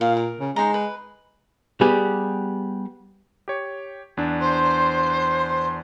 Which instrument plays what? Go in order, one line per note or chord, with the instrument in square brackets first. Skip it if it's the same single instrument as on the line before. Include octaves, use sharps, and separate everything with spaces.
[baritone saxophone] A#2 [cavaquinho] F5
[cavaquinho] A#4
[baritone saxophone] C#3
[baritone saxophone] G#3 [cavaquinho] D#4 C5 A#5
[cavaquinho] B4
[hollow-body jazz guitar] G3 B3 G4 G#4
[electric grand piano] G4 C#5
E2 D4
[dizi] C5 [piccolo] C6